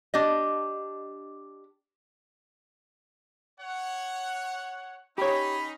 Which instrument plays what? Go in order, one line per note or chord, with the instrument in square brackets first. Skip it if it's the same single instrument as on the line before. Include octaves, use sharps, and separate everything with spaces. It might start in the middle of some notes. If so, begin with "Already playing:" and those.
[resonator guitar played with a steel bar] D4 G4 D#5
[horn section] C#5 F#5
[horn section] C#4 D#4 [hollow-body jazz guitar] G4 C#5 [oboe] B5